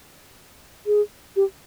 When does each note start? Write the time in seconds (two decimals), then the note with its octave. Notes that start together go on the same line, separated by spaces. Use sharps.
0.86 G#4
1.36 G4